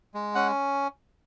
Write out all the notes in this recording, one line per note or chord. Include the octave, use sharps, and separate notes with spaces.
G#3
C#4 F#5